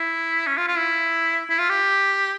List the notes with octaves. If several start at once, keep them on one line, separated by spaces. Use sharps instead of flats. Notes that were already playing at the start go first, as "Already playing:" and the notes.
Already playing: E4
C#4
F4
F4
E4
E4
F4
G4